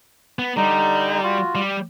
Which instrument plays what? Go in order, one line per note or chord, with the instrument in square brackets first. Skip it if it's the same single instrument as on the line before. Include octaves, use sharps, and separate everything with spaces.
[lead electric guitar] B3
[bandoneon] D3 D#4 A#5 [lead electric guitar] G3
[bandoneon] F4 F#4
[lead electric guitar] G3